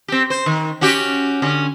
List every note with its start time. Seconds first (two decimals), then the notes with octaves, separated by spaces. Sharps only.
0.08 C4 G4
0.30 C5
0.46 D#3
0.81 C#4 F#4 G4
1.42 D3 C#4